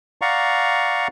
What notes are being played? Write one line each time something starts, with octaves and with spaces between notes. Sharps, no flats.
D5 F5 F#5 A#5 C#6